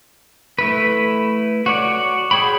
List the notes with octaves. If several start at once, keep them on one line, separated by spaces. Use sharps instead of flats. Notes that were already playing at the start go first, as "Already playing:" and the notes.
A3 E4 B4
F#4 C#5 D5
F#4 G#4 C#5 G5 B5